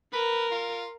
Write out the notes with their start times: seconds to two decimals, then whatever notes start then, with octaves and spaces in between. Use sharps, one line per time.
0.13 A#4 B4
0.51 F4